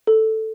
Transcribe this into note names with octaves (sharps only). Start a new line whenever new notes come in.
A4